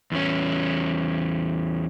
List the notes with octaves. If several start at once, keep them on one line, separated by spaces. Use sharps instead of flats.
E2 C#4